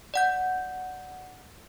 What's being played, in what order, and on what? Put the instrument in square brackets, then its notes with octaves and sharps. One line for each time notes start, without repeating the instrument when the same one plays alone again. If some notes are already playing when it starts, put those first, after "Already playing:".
[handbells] D5 F#5 G6